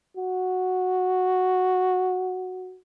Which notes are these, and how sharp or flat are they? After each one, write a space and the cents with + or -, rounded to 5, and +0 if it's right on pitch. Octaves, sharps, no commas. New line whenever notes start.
F#4 -5